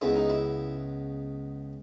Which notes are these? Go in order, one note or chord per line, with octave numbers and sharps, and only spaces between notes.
C#2 C#3 G#3 B3 E4
D#4
E4